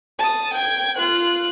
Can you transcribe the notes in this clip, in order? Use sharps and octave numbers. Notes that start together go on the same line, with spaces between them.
A5 D#6
G5 G#6
F4 F#6